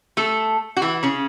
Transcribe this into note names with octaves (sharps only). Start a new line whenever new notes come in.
A3 A4
F#4
E3 E4
C#3 C#4